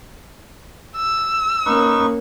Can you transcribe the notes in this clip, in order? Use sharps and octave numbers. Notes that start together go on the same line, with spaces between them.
E6
A#3 C#4 D#4 B4 C#6